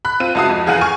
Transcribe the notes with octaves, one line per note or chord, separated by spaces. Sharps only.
B5 F#6
C4 F4 D#7
C#2 E4 F#4 A5 D#6 C7
F2
E2 G#4 F5 F#5 D#7 F#7
G#5 C#6 F6